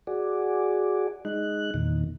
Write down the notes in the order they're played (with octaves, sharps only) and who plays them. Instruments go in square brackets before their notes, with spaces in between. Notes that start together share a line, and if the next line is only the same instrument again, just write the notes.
[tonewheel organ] F#4 G#4 D5
G#3 D#4 F#6
E2 A#2 D#3